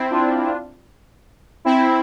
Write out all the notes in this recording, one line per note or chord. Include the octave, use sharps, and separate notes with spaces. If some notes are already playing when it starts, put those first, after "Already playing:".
Already playing: C4 E4
D4 F4
C4 E4